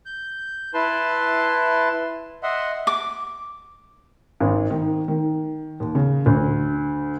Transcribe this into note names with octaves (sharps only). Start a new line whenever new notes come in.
G6
E4 B4 A5 C6
D#5 E5 F#5 C6
D6
G#1
D#3
D#3
D#2
C#3
D2